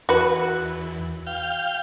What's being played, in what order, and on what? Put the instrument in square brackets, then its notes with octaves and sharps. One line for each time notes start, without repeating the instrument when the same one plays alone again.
[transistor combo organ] E2 [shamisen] F#4 B4
[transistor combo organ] F5 G5